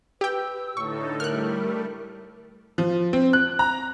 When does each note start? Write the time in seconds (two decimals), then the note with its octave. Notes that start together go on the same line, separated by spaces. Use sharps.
0.21 G4 B4 G5 E6
0.77 A2 D3 D#4 A4 C#6
1.20 G3 A3 A#4 F6 F#6
2.78 F3
3.13 C4
3.33 F#6
3.59 A#5